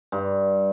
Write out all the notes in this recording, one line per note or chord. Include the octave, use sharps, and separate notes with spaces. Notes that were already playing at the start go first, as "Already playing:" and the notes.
G2